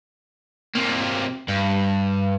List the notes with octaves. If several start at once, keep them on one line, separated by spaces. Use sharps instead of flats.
C3 A#3
G2